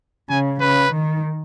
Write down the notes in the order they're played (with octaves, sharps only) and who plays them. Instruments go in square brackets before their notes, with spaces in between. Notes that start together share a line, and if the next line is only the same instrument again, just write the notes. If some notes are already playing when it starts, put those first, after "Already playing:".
[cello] C#3 [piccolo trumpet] G#5
[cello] C#3 [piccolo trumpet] B4
[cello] D#3